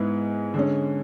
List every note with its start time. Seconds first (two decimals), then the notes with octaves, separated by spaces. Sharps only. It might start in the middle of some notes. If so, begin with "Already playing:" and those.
Already playing: G#2 G#3 B3 E4 G#4
0.54 D3 G#3 C#4